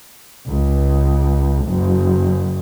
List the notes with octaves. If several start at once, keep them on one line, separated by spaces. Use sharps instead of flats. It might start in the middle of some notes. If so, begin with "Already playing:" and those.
C#2
F#1